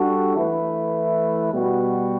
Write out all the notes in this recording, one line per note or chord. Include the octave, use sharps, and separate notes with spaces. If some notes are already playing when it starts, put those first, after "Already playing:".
Already playing: G3 D4 F#4 A4
E3 A3 E4 B4
B2 G3 B3 F#4